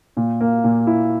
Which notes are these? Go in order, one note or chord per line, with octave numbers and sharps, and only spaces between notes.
A#2
A#3
A#2
E4